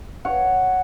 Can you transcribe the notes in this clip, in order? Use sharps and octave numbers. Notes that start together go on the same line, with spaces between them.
C#5 F#5